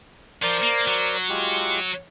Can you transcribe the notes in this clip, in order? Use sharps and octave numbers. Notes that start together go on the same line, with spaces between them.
F3 A#4 C5 D5
A#3
F#3
G#3 F4 G4